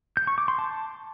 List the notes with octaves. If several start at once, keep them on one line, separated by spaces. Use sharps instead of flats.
G6
C#6
D6
C6
A5